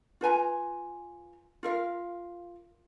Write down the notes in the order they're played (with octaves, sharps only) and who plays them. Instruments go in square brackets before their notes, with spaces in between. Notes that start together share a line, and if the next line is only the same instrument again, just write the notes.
[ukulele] F4 B4 G#5 A#5
F4 A#4 F5